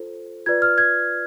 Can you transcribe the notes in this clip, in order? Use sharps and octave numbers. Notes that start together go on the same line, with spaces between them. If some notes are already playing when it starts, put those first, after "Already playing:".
Already playing: F4 A4 C5
F4 B4 D5 G#6
F6
G#6